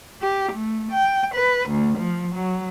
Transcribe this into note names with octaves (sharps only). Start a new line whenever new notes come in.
G4
A3
G5
B4
D2
F3
F#3